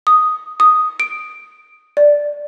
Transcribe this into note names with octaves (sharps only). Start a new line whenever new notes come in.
D#6
D#6
D7
D5